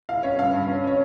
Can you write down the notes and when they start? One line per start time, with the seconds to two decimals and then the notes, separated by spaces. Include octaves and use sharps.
0.09 E4 F5
0.23 C#4 C#5
0.38 G2 F5
0.53 G2
0.68 C#4
0.84 C#4 C#5